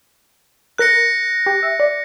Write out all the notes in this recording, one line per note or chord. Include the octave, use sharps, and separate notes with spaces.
A#4 F#6 A#6 C#7
G4
E5
D5